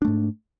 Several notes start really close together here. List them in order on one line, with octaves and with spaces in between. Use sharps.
D4 A3 G#2